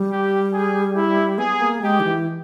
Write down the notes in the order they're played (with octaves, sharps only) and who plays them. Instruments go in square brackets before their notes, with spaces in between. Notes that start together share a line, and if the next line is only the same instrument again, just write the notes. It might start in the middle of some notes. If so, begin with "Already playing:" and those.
Already playing: [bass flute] G3
[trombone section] G4
G#4
E4
[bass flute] B3 [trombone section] G#4
[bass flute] A#3
[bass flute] G#3 [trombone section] G4
[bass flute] D#3
E3